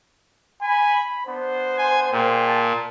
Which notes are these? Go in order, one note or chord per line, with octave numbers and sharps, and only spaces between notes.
G#5 B5
B3 D4 C5 F#5
G#5
A#2 G#4 G5
A5